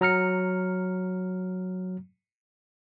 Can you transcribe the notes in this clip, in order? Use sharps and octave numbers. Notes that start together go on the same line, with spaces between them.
F#3 A#5 F6 C#7